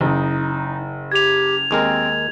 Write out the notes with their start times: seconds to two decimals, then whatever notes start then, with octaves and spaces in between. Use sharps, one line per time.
0.01 F#1 D#4
1.12 G4 G#6 F7
1.71 D#2 G#3 C4 A#4